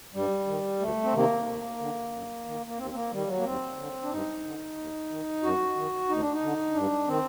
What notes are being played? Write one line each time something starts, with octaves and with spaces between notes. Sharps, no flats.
G2 G3
D#3
D2 A3
C4
C3 D#3 A#3
D#2
D3
F#2
D#3
A#3
D#2 C4
C4
A#3
D#3 G3
F#3
A#3
D#2 C4
D3
D4
G2 D#4
D3
D#2
D#3
F#2 F#4
D#3
D2 D#4
D4
D#4
D3
G2 D4
D#3 C4